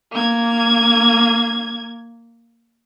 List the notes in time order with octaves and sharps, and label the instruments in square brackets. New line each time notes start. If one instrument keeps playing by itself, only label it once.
[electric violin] A#3 G#6